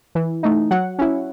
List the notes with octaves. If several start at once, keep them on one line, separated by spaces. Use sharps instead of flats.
E3
A3 D#4
F#3 F#5
C#4 E4